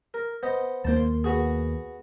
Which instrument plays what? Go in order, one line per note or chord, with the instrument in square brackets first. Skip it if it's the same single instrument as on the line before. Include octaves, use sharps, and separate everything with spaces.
[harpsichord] A#4
B3 C5 D#5
[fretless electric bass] D#2 A#3 [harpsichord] C5 A5
[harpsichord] C6
B3 F#4 G#4